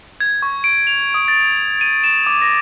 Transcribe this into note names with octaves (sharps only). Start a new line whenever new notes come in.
G#6
C#6
D7
F7
D#6
A6
D#7
E7
D6
A#6